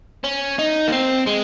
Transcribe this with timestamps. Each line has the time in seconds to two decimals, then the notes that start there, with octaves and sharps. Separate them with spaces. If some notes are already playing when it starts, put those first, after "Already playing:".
0.24 C#4
0.59 D#4
0.88 A#3
0.93 C4
1.27 G#3